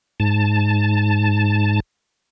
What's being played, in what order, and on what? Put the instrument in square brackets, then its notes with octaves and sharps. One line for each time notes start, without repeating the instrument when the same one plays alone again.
[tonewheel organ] G#2 A5